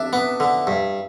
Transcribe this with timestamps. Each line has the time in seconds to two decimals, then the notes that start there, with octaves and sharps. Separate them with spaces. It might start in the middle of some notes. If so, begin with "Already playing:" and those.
Already playing: D4 E5
0.13 B3
0.40 D3
0.67 G2